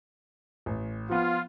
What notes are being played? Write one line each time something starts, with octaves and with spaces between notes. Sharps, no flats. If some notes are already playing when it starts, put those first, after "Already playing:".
A1
F3 B3 F4